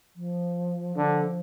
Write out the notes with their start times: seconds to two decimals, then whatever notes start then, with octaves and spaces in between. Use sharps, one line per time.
0.16 F3
0.96 D3 F3